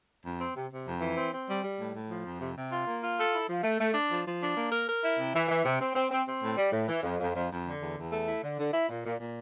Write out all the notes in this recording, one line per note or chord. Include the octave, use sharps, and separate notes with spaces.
F2
C4
C3
C3
F2
E3
C4
C4
G3
G3
A2
A2
F3
F2
C3
C3
F4
A#3
F4
A4
E4
F3
A3
A3
D4
F3
F3
D4
A#3
A#4
A#4
E4
C3
E3
E3
C3
C4
C4
C4
C4
A2
G3
A2
E3
F2
F2
F2
F2
D3
E2
E2
A3
E4
D3
D3
E4
A#2
A#2
A#2